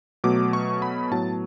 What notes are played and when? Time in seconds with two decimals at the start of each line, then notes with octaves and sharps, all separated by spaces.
0.24 B2 F#3 A3 D6
0.53 C#6
0.82 B5
1.11 A2 F#3 B3 A5